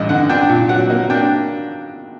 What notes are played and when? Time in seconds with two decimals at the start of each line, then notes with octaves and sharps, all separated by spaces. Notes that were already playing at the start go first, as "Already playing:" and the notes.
Already playing: A1 G2 D#5
0.09 D3 F#5
0.29 D4 G5
0.49 A#2
0.69 F#3 F#5
0.90 A#3
1.10 D4 G5